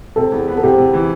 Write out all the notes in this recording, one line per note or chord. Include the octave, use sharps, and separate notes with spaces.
C3 A4
E2
B3
A4
C3 G4
C3
E3